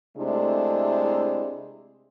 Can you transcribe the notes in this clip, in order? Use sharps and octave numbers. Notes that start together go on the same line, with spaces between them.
C3 G#3 A3 D4 E4